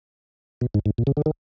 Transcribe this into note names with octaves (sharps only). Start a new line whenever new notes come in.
B2
G#2
G#2
A#2
C#3
D3
D#3